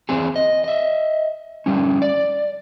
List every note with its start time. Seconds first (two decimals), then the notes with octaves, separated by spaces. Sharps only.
0.09 E2 C4 G#4
0.36 D#5
0.64 D#5 E5
1.66 D3 G3 C#4
2.02 D5